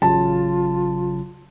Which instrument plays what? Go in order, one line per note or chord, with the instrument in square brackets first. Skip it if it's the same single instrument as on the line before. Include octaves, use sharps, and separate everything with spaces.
[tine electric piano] A1 C#3 F#3 [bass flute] F4 [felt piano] A5